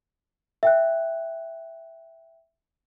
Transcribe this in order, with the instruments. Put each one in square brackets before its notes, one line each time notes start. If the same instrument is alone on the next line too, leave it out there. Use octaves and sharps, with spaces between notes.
[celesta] E5 G5 F#6